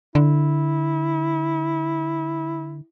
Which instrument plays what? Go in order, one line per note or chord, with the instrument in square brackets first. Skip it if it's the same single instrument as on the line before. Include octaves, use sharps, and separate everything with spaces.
[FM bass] D3 [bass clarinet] E4